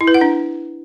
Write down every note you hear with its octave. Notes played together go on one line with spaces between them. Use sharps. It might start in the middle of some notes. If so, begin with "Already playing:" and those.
E4
B4
F#5
D4